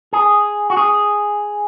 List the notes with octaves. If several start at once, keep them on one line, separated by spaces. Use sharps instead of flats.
G#4
F#4
G#4